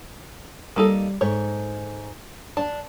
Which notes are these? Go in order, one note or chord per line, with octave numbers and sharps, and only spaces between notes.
G3 A#3 D#4 A4
G#2 A4 C#5
D4 A5